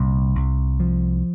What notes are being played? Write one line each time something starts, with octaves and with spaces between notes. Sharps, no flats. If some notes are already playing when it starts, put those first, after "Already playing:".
Already playing: C2 A#2
C2
F3